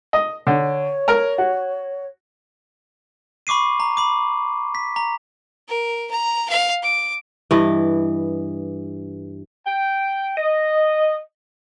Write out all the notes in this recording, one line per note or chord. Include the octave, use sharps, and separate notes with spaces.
D#5
D3 C#5
A#4 A#5
F#4
B5 C#6 D6 C7 D#7
A#5
B5 D6
B6
A#5
A#4
A#5
F5
D6
G2 E3 D#5
G5
D#5